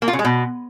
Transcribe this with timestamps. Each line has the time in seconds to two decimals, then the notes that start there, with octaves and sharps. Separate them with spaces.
0.02 A#3
0.08 F4
0.13 C#3
0.19 G#3
0.25 B2